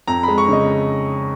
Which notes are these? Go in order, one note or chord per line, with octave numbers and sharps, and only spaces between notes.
F2 A#5
G#3 B5
C#6
C#3 D#5